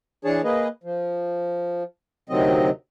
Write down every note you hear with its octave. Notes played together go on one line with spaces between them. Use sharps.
E3 D4 G#4 C#5 A5
A#3 G#4 B4 D#5
F3
D2 C3 D#3 F#3 C4 D#5